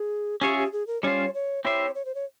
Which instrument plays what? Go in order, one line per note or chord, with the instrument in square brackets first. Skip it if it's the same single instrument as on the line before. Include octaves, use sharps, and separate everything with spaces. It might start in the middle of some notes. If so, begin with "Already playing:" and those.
Already playing: [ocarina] G#4
[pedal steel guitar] C#4 F4 G#4 C#5 E5 [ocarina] G4
[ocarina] G4
G#4
A#4
[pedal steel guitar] G3 C#4 F4 C5 [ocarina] C#5
[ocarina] C#5
[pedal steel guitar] C4 E4 G4 C5 E5 [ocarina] C#5
[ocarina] C#5
C5
C#5